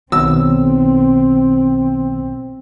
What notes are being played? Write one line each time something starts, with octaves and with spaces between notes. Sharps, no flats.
B1 D#3 F#3 B3 C4 E6